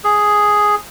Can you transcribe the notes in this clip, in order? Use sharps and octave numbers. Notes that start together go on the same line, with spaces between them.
G#4